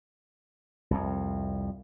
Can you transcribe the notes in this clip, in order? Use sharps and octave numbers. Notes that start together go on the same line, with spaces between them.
C2 F2